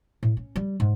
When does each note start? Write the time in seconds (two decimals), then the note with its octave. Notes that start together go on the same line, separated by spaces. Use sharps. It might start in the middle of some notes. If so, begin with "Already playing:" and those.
0.23 A2
0.37 C#4
0.56 G3
0.80 G#2